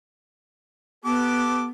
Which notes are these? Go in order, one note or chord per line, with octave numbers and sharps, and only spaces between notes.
B3 G4 A4 D6